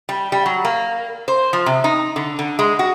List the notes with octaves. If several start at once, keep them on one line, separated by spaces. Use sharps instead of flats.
G3
G3
F#3
A#3
C5
F3
C3
D#4
D3
D3
G#3
F#4